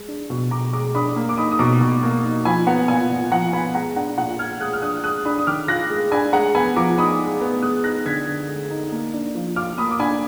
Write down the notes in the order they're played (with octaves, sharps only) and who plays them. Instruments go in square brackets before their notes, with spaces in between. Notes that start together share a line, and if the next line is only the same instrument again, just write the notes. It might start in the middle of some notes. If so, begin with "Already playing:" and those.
Already playing: [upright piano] G#3
D4
B2
B2 A#5 D6
G#3 A#5 D6
D4 B5 D#6
A#3
D6
D#4 B5 D#6
D#6
B2 A#5 D6
B2
A#3
D#4
F3 G#5 B5
B3 F#5 A#5
A#2 G#5
A#2
F3 F#5 A#5
B3 G#5 B5
G#3 F#5 A#5
D4 F#5 A#5
A#2 F#5 A#5
F4 F6 G#6
G#3 D#6 F#6
F6
D4 D#6 F#6
G#3 D#6 F#6
D4 B5 D#6
D#6
D#3 D6 F6
F4 F#6 A#6
G#3
D4 G#5 B5
G#3 F#5 A#5
B3 G#5 B5
F3 A#5 D6
D#4 B5 D#6
G#3
B3
G#3 D#6 F#6
D#4 F#6 A#6
D3 G#6 B6
D3
G#3
D#4
A#3
D4
F3
F4 D6 F6
A#3 B5 D#6
D6
D4 G#5 B5